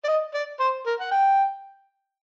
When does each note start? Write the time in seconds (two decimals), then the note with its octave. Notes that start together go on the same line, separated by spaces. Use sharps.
0.05 D5
0.08 D#5
0.34 D5
0.60 C5
0.86 A#4
1.00 F#5
1.11 G5